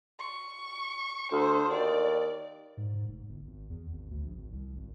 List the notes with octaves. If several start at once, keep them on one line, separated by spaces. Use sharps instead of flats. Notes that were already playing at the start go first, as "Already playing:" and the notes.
C#6
D2 C5
D#2 D5
G#2
G#2
F1
G1
G#1
E2
G#1
D2
A#1
G#1
C2
G#1